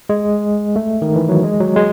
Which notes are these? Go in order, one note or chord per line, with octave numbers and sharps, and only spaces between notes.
G#3
A3
D#3
E3
F#3
G#3
F#3
G#3